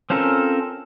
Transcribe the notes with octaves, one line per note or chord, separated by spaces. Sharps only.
C4 C#4 F4 A4 A#4